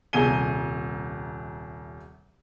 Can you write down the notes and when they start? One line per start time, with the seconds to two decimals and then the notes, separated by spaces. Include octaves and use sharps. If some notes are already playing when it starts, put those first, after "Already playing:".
0.13 D#1 C2 G#4 D#7 G7